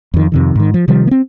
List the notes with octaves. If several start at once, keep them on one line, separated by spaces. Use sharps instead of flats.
F2 D#3
F2 C3 D#3
G#2 D#3
F3
C3 D#3 F3 G3
A#3 C4